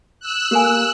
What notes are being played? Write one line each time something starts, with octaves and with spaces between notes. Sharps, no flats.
E6 F#6
A#3 G4 A4 G#5